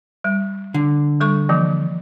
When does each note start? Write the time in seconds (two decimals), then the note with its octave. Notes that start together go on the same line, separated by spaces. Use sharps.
0.24 G3
0.74 D3
1.20 G3 A4 C#6
1.49 E3 F3 A#3